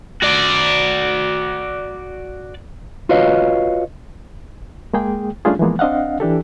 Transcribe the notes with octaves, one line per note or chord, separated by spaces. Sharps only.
F#4 D5
F4 F#4 B4 C#5 D#5 F5
G#3 A#3 G#4 G5
G3 A3 C#4 D4 F4 G#4
E3 F3 G#3 A#3 B3
C4 D4 D#5 F5 F#5
E3 D4 G4 A4